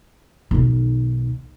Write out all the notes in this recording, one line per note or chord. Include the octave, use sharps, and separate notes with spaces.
B1 D#3